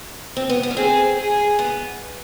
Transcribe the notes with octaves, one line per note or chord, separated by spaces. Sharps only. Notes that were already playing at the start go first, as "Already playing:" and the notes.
C4
B3
B3
C#4
C4 G#4
G#4
B3